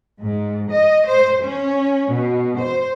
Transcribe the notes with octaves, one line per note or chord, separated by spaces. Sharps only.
G#2
D#5
C5
C#4
B2
C5